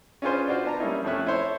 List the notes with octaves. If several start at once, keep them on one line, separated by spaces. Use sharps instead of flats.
C#4 D4 F4 G#4 B4 C5
D4 F4 F#4 C5 D5
B3 D4 A5 A#5
G3 A#3 C#4 D#4 E4
F2 F3 A3 C#4 E5 F#6
E4 A4 C5 C#5